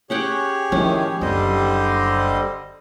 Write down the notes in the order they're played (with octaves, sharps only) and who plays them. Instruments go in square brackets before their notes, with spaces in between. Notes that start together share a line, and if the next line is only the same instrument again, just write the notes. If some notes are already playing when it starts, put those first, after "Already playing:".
[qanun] C#4 F#5 G5 [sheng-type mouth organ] G4 G#4 C#5
[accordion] A2 D#3 [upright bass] F3 [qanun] C#4
[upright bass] F#1 F4 [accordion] D3 G3 [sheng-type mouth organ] G4 C5 D#5